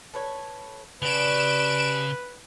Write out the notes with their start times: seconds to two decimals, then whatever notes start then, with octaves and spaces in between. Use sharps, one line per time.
0.14 A4 B4 C#5
1.02 C#3 D4 G4 B4 D7 E7